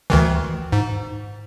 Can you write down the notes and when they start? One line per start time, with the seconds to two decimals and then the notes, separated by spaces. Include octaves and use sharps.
0.10 D2 D#3 E3
0.72 G#2